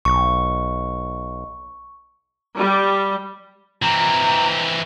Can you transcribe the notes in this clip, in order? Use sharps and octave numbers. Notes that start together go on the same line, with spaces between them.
B1 C#6
G3
E3 C4 A#5